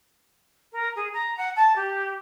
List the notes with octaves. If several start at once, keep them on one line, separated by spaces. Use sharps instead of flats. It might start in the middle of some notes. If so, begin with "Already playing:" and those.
A#4
G#4
A#5
F#5
A5
G4